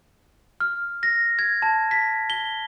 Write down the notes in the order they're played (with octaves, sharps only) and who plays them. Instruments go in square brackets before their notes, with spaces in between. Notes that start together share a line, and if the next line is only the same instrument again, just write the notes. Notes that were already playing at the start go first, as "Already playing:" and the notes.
[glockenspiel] F6
A#6
G#6
A5
B6
G7